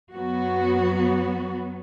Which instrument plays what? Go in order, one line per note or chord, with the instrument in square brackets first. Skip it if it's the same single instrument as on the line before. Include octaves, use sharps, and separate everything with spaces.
[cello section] F#2 F#3 B3 F#4